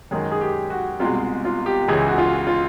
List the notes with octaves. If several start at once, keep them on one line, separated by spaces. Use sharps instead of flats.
F#2 D#3 G#3 G#4
G#4
G4
F#4
C2 B2 G#3 F4
F4
G4
C#2 C#3 E3 G#3 G#4
F#4
F4
F4